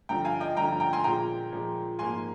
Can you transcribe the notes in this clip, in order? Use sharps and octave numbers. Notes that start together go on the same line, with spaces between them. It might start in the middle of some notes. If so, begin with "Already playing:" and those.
G2 D3 F3 G5 A#5
F5 G#5
D#5 G5
G2 D3 F3 G5 A#5
G5 A#5
G#5 C6
A#2 F3 G#3 G5 A#5
A#2 F3 G#3
G#2 F3 A#3 G#5 C6